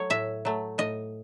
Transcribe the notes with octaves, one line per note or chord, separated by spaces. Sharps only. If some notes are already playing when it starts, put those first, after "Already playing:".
Already playing: F#3 A3 C#5
A2 E5
F#3 A3
A2 D#5